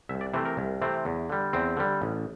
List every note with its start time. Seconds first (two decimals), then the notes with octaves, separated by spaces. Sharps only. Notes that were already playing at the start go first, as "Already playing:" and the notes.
0.09 C2 E5
0.21 D5
0.33 C3 E3 A3 C4 C5
0.45 A#4
0.57 C2
0.82 C3 E3 A3 C4
1.05 E2
1.30 D3 G3
1.53 E2 C4
1.77 D3 G3
2.02 A1